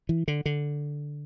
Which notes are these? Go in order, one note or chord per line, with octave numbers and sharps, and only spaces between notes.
E3
D3
D3